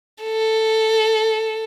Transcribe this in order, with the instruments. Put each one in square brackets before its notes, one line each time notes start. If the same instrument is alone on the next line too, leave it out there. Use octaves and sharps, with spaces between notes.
[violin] A4